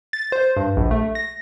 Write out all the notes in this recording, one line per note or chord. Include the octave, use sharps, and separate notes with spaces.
A6
C5
G2
A#1
A3
A#6